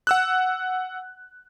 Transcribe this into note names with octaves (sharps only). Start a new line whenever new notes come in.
F#5 E6 F#6